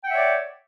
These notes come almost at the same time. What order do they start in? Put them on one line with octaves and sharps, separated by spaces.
G5 F#5 E5 C#5 D5